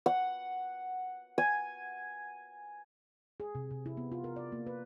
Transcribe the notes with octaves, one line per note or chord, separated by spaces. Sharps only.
F#5
G#5
G#4
C3
C3
E4
B3
F4
A#4
D5
A#3
B4